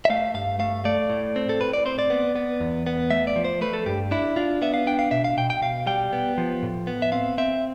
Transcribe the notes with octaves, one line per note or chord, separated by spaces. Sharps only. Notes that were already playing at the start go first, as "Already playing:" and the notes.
E5
A3 F5
G2 F5
A3 F5
A3 D5
A2
C4
A4
A2 B4
D5
C4 C5
D5
B3
B3
E2
B3
A3 E5
D5
F3
C5
A3 B4
A4
G2 G4
D4 E4
D4 F4
B3 E5
F5
D4 G5
F5
B2 E5
F5
B2 G5
G5
B2 F5
G3 G5
B3
F3
A2
B3
E5
C4 F5
C4 E5